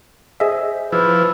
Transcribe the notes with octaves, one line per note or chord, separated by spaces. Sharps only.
G#4 C5 D#5 E5
F3 E4 B4